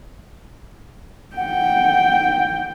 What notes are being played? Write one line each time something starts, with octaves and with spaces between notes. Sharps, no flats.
F#5 G5